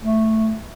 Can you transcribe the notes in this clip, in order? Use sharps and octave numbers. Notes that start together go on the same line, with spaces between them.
A3